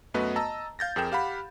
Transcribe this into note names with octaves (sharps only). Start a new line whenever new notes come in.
F#2 A3 B3 F#4 B4 D#5
D#5 A5 A#5 E6
F5 G6 A6 A#6
F2 G#4 A#4 G5 E7
G4 F5 F#5 B5